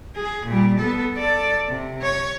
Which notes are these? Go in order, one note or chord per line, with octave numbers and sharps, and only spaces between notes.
G#4
A#2 G3
B3 A4
A4 D5
C3
C#5